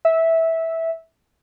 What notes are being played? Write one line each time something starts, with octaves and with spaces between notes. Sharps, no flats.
E5